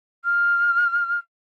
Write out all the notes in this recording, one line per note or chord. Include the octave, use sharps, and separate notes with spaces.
F6